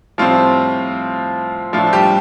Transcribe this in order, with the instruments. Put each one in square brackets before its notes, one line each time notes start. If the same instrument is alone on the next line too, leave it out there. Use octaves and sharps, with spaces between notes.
[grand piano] A2 F3 G3 C4 F4
A2 F3 A3 D4 F4
G3 G4